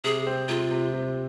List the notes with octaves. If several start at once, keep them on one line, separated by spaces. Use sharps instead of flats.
C3 G#4
C4
C3 F4
C3
C3